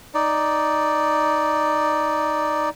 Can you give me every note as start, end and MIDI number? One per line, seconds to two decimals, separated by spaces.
0.14 2.69 63
0.14 2.69 74